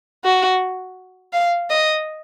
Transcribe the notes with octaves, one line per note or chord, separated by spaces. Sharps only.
F#4
F5
D#5